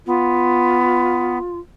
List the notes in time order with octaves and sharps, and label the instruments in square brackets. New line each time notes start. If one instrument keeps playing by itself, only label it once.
[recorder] B3 [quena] F4